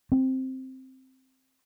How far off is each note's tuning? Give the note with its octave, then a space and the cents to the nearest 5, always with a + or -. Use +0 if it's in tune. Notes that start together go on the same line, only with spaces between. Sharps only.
C4 +0